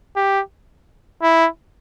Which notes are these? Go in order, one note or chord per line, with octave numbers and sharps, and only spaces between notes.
G4
E4